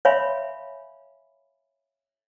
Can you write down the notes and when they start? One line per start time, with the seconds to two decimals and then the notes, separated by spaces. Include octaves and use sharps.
0.05 C#5 E5 F5 G#5 B5 C6